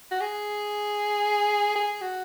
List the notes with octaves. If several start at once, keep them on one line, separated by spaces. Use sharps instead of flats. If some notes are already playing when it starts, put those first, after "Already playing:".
F#4
G#4
G#4
F#4